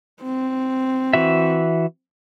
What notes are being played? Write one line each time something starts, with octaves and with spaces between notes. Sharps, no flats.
C4
E3 F#4 E5